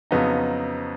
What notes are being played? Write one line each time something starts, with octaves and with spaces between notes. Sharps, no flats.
F2 C#3 F#3 B3 D#4